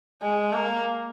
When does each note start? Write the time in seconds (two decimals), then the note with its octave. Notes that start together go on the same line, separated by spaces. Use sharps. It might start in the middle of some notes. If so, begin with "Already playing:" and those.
0.22 G#3
0.53 A#3